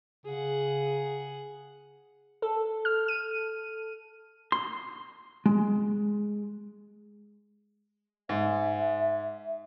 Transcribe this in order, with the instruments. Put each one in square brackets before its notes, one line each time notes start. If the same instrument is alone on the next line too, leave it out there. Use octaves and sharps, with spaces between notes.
[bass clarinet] C#3 [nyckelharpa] G#4 F#5
[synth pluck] A4
F6
D#7
[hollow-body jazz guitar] C6
G#3
[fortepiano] G#2 [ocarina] E5